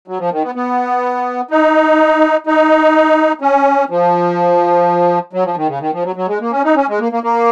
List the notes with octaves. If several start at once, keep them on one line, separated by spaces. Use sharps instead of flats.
F#3
F3
D#3
B3
B3
D#4
D#4
C#4
F3
F#3
F3
D#3
C#3
D#3
F3
F#3
F#3
G#3
A#3
C#4
D#4
C#4
G#3
A#3
A#3
A#3